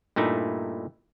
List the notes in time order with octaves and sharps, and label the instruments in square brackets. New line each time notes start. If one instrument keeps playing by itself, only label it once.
[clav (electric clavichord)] G2 A#2 A3 D#4 E4